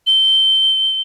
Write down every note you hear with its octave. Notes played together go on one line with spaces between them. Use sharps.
G7